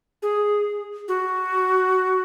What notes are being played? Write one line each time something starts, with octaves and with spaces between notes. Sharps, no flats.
G#4
F#4